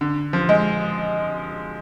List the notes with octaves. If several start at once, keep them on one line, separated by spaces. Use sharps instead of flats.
D3
F3
G#3